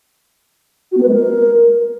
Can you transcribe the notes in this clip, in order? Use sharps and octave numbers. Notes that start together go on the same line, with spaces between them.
F#4
B3
B4
G#3
A#4